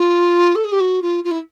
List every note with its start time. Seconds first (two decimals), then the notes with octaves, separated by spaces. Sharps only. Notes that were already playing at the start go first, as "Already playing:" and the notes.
Already playing: F4
0.55 A4
0.64 G#4
0.72 G4
0.80 F#4
1.02 F4
1.24 F4
1.31 E4